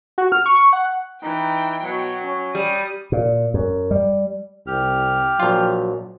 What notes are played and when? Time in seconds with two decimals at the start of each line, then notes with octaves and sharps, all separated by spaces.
0.18 F#4
0.32 F6
0.46 C#6
0.73 F#5
1.23 E3 D#4 G5
1.84 B2 F#3
2.23 C#4
2.55 G3 D#6
3.12 A#2
3.54 F#2
3.91 G3
4.67 C2 G4 F6
5.40 A#1 F#3 F4